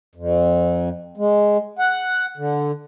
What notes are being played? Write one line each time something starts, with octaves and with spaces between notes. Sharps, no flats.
F2
G#3
F#5
D3